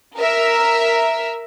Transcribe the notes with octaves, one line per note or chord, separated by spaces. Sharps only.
A#4 E5